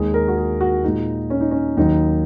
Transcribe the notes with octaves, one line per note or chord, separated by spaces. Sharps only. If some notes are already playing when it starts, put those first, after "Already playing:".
Already playing: D#2 D#3 G#3 G#4
A#4
F#4
G#4
F#4
A#2 G#3 D#4
C#4
D#4
C#4
D#2 D#3 F#3 D#4